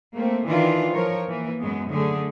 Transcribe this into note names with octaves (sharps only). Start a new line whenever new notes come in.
A3 A#3 C4
D#3 E3 D4 F4
F3 A#4 C#5
E3 A#3
F#2 F#3 G#3 B3
D3 A3 G#4